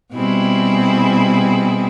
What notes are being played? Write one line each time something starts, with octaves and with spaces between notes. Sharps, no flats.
B2 G3 C4 E4 G#4